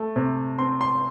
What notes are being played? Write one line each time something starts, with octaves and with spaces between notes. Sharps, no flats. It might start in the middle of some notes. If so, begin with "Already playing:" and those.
Already playing: A3
C3
C4 C6
C6